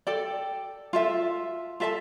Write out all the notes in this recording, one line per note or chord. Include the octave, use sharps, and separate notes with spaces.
A4 D5 G5
F4 A4 E5
F4 A4 E5 A5